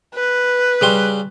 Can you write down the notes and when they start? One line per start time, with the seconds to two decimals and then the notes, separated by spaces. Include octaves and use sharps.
0.15 B4
0.81 C#3 G3 C6